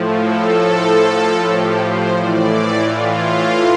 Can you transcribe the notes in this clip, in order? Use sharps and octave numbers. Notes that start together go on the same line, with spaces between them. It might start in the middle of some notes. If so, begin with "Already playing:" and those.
Already playing: A2 F3
A4
G4
C5
A2 E3 D5
F4